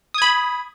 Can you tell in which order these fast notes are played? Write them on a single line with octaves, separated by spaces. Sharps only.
D#6 G#6 B5